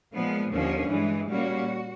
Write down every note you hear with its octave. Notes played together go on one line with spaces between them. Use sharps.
A#2 F3 G#3 B3
D#2 D3 F3 A#3 C#4
G2 E3 G#3
A#2 G3 A#3 C#4 F#4